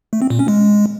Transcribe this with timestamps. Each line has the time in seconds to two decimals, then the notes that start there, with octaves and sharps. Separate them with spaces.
0.13 A3
0.22 C4
0.30 A#2
0.39 C#4
0.48 G#3